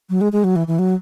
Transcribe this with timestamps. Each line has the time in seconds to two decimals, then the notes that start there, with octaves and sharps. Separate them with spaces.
0.10 F#3
0.21 G#3
0.32 G#3
0.44 F#3
0.56 E3
0.67 E3
0.79 F#3